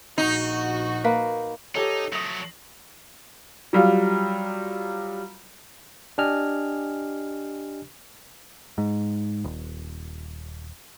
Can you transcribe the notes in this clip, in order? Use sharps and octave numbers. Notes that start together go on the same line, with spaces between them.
A#1 D#4 F#4
A#3 B4
D#4 G4 A4 C#5
F#3 A3 D#6 A#6
F#3 G3 F4
D4 G4 D#5 G#5 F6
G#2
D#1